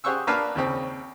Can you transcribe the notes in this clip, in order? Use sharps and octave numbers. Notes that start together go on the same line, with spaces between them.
G4 G#4 C5 F#5 C#6 E6
A#3 D4 B4 F5 A5
D#2 C#3 C4